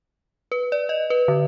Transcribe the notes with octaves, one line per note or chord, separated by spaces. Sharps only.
B4
D5
D#5
B4
D3